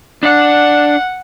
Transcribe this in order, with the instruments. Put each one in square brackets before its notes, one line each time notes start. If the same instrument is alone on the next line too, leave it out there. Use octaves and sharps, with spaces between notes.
[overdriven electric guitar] D4 D5 [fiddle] F#5